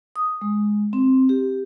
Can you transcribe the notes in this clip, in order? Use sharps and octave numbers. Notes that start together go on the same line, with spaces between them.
D#6
G#3
C4
G4